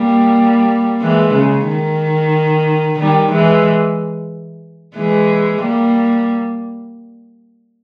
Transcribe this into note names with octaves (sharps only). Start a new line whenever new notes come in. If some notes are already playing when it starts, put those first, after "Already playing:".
Already playing: G3 A#3
E3 G#3
C#3
D#3
D#3 G3
E3 G#3
E3 G#3
G3 A#3